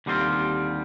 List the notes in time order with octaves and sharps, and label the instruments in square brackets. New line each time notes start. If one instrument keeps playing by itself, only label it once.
[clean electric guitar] D#2 D3 G3 C4 F4